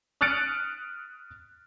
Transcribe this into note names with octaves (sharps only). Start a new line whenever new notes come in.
D#6 F6 F#6 A6 C#7 D7